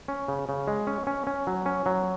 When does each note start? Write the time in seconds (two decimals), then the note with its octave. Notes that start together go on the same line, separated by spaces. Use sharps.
0.08 C#4
0.28 C#3
0.49 C#3
0.68 G#3
0.87 C#4
1.07 C#4
1.27 C#4
1.47 F#3
1.66 C#4
1.86 F#3